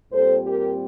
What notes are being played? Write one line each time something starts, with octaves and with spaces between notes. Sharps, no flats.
A#2 G3 C4 A4 C5
G4 A#4